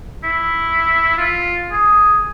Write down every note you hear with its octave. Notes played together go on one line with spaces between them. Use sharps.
E4
F4
G#4